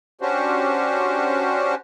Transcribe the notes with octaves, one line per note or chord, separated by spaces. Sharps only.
C#4 D4 F#4 G4 C5